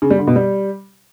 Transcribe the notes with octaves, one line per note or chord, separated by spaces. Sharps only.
C#3
G3
D3
B2
G3